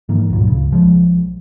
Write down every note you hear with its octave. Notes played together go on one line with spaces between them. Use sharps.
G#2 D#3 E3 A#3
C#2 G2 A#2 F#3
C#2 C#3
B1 F3 G#3